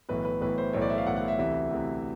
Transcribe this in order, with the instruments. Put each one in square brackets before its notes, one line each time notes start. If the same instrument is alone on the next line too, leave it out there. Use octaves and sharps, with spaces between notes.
[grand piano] B1 A2 E3 B4
B4
B1 A2 E3 B4
C5
B1 A2 E3 C#5
D5
E5
F5
B1 A2 E3 F#5
F#5
E5
D2 C3 E3 E5
D2 C3 E3